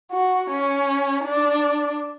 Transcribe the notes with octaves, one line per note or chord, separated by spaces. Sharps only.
F#4
C#4
D4